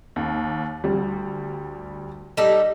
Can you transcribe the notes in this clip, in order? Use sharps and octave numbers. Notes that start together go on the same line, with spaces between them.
D#2
D2 G3
G3 D#4 A4